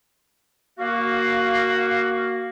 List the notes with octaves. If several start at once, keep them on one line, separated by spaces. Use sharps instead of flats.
A#3 F#4 F5